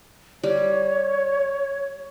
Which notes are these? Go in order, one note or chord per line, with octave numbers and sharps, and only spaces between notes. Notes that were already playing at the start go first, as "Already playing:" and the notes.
G3 C#5